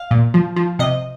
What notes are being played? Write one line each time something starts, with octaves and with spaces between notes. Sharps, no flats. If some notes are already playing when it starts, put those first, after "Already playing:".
Already playing: F5
A#2
F3
F3
C3 D#5